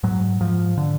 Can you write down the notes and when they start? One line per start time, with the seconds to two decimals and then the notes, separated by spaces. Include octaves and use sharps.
0.03 G#2 F#3
0.41 G#2 F3
0.77 D3